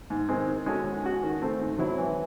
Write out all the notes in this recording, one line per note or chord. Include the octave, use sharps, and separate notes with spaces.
G#2
D#3 G#3 C4
D#3
G#3 C#4 F#4 A4
G#3
C#4 F#4
D#3
A3 C4
G#2
F#3 C4 E4
E3